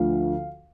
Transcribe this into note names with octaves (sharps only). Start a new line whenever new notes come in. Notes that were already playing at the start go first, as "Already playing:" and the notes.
Already playing: D2 D3 F3 F5